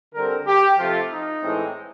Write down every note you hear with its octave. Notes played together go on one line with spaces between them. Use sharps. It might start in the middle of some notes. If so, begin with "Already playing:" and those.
D3 G3 C4 A#4
G4
C3 F3 A3 F4
D#4
A2 E3 G#3 C4